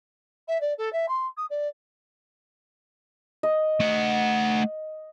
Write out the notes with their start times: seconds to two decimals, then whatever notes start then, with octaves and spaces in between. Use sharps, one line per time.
0.48 E5
0.61 D5
0.78 A4
0.93 E5
1.08 C6
1.37 D#6
1.50 D5
3.43 D#5
3.80 A3 F#5